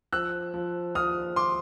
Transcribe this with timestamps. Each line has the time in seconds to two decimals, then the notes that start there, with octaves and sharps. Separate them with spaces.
0.12 F3 E6 F#6
0.54 F3
0.95 F3 D#6 F6
1.36 C6 D6